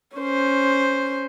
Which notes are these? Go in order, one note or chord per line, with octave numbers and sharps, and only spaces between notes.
C#4 C5